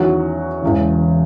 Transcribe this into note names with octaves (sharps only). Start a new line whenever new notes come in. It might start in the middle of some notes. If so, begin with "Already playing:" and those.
Already playing: E2 D#3 F#3 C#4 F#4
E1 E2 C#3